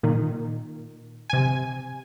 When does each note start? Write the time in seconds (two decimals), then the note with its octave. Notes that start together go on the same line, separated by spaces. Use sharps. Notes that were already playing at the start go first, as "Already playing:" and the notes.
0.03 A#2 D#3
1.30 C3 G#5